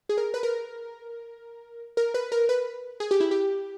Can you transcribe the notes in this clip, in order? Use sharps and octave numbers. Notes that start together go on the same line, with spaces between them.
G#4
A#4
B4
A#4
A#4
B4
A#4
B4
G#4
G4
E4
G4